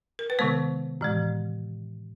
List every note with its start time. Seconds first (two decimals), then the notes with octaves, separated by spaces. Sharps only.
0.19 A#4
0.30 B4
0.39 C3 D#3 G#3 B3 C5
1.01 A2 E3 G#3